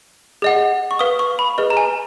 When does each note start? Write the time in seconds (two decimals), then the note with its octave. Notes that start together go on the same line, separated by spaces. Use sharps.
0.42 G#4 D#5 F#5
0.91 C#6
0.99 B4 F5 D#6
1.19 C#6
1.39 B5
1.58 G#4 B4 D#5
1.70 A#5
1.77 G#5